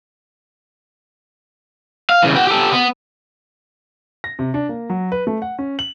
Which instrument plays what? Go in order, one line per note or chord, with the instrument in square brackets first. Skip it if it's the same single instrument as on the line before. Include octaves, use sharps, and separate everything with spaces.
[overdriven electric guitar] F5
C#3 E3
F#4 G5
G4 A4
B3
[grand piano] A#6
C3
D4
A#3
F#3
B4
A3
F#5
C#4
F#7